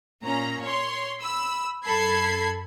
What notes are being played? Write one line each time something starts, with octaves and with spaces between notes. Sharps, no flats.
A#2 C#4 A#5
C#5 C6
B5 E6
F#2 A4 B5 G#6 C7